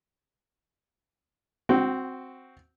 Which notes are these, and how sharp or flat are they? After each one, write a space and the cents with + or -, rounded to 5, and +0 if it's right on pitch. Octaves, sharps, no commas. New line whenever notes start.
C4 +0 F#4 +0 G5 -30